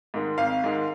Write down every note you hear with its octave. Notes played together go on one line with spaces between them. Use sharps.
G#2 D#3 G#3
G#1 F5
G#2 D#3 G#3